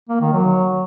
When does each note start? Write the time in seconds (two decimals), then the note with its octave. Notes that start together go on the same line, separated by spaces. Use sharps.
0.09 A#3
0.21 D#3
0.33 F#3